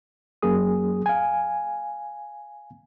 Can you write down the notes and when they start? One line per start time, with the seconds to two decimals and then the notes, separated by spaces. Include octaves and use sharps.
0.42 F#2 F#3 A#3 C#4 G#4 D#6
1.06 F5 G#5